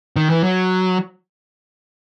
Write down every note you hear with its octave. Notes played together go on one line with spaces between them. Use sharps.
D#3
E3
F#3